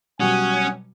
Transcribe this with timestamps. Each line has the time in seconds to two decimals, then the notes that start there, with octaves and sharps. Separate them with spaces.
0.20 B2 F#3 G3 C#4 F#5 G#5 D#6